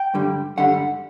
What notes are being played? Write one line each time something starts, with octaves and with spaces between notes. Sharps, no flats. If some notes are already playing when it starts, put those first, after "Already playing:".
Already playing: G5
G2 D3 G3
G2 D3 G3 F#5